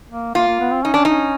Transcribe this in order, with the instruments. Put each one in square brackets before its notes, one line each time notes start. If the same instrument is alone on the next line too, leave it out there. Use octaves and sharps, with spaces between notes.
[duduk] A#3
[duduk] A#3 [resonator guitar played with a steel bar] F4
[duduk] A#3
B3
C4
[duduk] C#4 [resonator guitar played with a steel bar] D#4
[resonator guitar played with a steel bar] D4
[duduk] C#4 [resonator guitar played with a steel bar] D#4